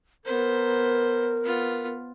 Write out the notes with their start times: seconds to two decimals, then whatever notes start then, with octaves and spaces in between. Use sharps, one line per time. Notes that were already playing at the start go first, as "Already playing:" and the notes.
0.25 B3 A#4 C5
1.43 B3 F4